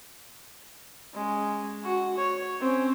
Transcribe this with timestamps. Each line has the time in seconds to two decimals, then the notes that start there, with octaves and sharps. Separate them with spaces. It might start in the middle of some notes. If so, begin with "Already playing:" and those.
1.15 G#3 C#4
1.84 F#4
2.17 C#5
2.60 C4 C#4